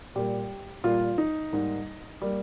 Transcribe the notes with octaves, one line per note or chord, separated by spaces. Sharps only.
A#2 G3 A#3 G4
A#2 G3 A#3 F4
D#4
G#2 G3 A#3
G3 A#3